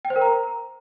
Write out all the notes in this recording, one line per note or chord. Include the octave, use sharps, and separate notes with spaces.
G5
C5
A#4
A#5